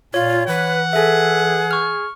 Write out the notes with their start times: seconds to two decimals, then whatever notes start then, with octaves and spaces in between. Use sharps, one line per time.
0.14 A#2 F4 C#5
0.48 E3 B4 F#5
0.93 G#4 A4 E5
1.71 C#6 F6